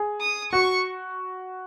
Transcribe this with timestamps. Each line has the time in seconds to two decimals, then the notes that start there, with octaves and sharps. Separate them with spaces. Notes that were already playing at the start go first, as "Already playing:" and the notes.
Already playing: G#4
0.21 D#6
0.52 F#4 C#6